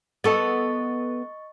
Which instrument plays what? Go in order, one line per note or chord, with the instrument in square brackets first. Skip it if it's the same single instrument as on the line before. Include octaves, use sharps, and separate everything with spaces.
[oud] B3 A4 [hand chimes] D#5 C#6 A6